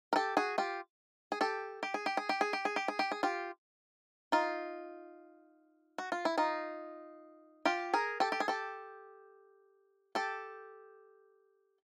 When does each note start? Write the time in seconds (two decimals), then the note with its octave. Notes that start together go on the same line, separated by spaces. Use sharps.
0.13 A#4
0.16 G4 A4
0.37 F#4 G#4
0.58 F4 G4
1.32 G#4
1.41 G4 A4
1.83 G4
1.94 G#4
2.06 G4
2.17 G#4
2.29 G4
2.41 G#4
2.53 G4
2.65 G#4
2.76 G4
2.88 G#4
2.99 G4
3.12 G#4
3.23 F4 G4
4.32 D#4 F4
5.98 F#4
6.12 F4
6.25 E4
6.37 D#4 F4
7.65 F4 G4
7.94 G#4 A#4
8.20 G4 A4
8.32 G4
8.40 G#4
8.48 G4 A4
10.15 G4 A4